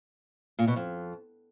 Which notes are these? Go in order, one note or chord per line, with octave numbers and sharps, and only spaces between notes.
A#2
B2
F2